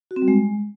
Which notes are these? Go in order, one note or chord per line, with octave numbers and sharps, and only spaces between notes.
F#4
C4
G3
G#3